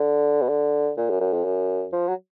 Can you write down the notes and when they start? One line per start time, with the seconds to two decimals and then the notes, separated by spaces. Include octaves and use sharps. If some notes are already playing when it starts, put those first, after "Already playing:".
Already playing: D3
0.42 B2
0.49 D3
0.97 A#2
1.09 F#2
1.20 F#2
1.33 F2
1.44 F#2
1.93 F3
2.08 F#3